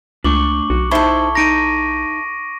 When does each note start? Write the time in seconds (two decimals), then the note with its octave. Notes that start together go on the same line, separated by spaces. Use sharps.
0.24 C#2 A3 D4 C#6 D6 F#7
0.70 B1 F#4
0.91 D#4 E4 A4 C5 A5 C#6
1.35 D#4 A#5 A#6 D7 D#7